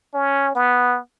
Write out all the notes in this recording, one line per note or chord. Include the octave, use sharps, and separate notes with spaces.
C#4
B3